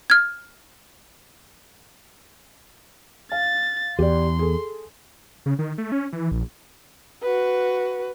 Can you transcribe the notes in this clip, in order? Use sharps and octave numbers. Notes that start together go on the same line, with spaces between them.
F6 G#6
F5 A6
E2 G4 D5 C6
G#4 A4
C#3
D#3
A3
C#4
E3
A#1
F#4 B4